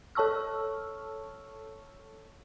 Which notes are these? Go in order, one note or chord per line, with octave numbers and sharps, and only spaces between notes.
A4 C#5 A5 C#6 E6 F6